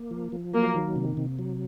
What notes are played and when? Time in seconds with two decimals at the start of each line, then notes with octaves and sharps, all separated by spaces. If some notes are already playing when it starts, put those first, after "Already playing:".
Already playing: A#3
0.11 F3
0.32 F3
0.53 F#3 A#3
0.75 D#3
0.96 C3
1.17 C3
1.39 F#3